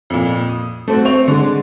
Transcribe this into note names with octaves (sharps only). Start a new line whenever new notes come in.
F2 A#2
D#6
A3 C4 F#4
C4 C5 C#6 F7
D3 G#3